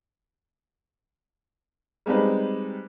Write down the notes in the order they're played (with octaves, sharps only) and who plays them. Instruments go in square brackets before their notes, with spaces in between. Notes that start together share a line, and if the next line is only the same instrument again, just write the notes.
[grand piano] G3 G#3 C4 D#4 B4